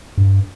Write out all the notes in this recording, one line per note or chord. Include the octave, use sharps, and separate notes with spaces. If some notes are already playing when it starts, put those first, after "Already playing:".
G2